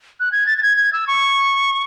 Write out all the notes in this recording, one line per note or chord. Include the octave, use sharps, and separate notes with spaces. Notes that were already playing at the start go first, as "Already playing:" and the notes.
F#6
G#6
A6
A6
G#6
G#6
E6
C#6